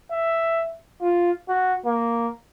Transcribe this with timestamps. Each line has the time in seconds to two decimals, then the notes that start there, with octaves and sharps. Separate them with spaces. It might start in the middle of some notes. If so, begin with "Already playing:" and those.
0.12 E5
1.02 F4
1.48 F#4
1.86 A#3